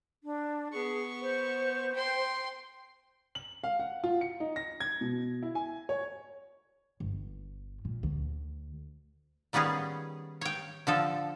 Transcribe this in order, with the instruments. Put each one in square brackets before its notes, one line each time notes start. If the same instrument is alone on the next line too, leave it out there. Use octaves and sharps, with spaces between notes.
[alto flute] D4
[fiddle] B3 C#6 [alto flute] G#4
[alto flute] C5
[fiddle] G5 C6
[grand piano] F#7
F5
F#5
F4
C#7
D#4
A#6
G#6
B2
E4
G#5
C#5
[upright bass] G1
A#2
D2
[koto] D#3 G3 B3 C#4 G#4
C#5 G5
D3 F3 A4